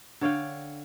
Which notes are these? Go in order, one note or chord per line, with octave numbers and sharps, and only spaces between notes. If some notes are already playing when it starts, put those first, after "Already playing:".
D3 C#5 F5 G5